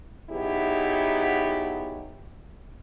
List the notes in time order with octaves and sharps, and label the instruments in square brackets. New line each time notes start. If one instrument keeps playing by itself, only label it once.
[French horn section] F#3 B3 D#4 E4 G4 G#4